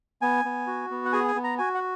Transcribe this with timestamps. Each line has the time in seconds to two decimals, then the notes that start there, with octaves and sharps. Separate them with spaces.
0.22 B3 G#5
0.45 B3
0.67 F#4
0.91 B3
1.05 F#5
1.13 G#4 G#5
1.28 G#5
1.36 B3
1.44 A#5
1.58 F#4 G#5
1.75 F#5